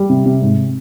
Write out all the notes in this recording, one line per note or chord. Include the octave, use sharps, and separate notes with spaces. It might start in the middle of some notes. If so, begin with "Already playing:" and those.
Already playing: G3
C3
C3
G#2